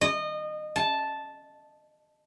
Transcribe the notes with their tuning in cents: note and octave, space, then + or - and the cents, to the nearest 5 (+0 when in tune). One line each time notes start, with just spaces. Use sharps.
D#5 -25
A5 -5